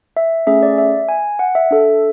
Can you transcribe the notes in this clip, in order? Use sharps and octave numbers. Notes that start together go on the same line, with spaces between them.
E5
A3 C#4 G#4 E5
D5
E5
G#5
F#5
E5
D4 A4